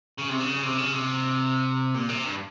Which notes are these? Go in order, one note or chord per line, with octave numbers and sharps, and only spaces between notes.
C#3
C3
C#3
C3
C#3
C3
A#2
C3
G2